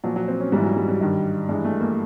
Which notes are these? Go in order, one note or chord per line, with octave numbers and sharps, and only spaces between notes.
A#2 F3 F#3
F#3
C4
C#4
G#2 E3 G3
F#3
G3
G3
G2 D#3
G2 E3 G#3
A3
A#3